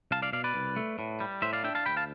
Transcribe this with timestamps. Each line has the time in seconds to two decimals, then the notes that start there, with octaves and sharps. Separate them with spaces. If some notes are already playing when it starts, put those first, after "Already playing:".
0.11 C2 F5 A5
0.22 D5 F5
0.33 B2 D5 F5
0.44 B4 D5
0.55 C2
0.76 A3
0.99 A2
1.20 G3
1.42 A2 C5 E5
1.53 D5 F5
1.64 D4 E5 G5
1.75 F5 A5
1.86 D2 G5 B5
1.97 F5 A5